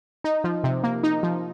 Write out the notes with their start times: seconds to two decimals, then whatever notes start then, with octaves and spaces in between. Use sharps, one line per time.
0.24 D#4
0.44 F3
0.64 C3
0.83 A#3
1.03 D#4
1.23 F3